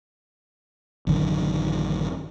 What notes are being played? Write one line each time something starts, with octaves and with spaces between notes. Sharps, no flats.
A1 F#2 D3 D#3